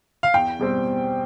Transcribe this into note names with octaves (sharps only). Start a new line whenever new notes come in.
F5
E2 G5
B2 G3 C4